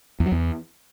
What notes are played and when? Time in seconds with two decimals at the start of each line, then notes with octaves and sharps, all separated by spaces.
0.20 E2
0.26 F#3
0.32 E2